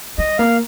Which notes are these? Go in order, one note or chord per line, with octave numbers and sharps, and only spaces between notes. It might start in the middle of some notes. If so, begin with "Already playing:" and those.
G3 D#5
A#3 F5